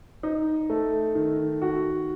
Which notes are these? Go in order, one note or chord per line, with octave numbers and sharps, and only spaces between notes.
D#4
A3
D#3
F#4